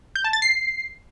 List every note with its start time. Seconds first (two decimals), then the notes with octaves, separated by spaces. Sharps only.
0.16 G6
0.24 A5
0.33 A6
0.42 C7